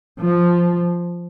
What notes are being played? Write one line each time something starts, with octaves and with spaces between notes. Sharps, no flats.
F3